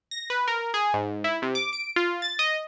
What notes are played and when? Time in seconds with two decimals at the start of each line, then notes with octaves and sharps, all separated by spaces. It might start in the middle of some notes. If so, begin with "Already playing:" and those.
0.11 A#6
0.30 B4
0.48 A#4
0.74 G#4
0.94 G#2
1.24 E4
1.42 C3
1.55 D6
1.73 D7
1.96 F4
2.22 A6
2.39 D#5